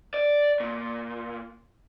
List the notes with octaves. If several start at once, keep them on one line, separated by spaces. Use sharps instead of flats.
D5
A#2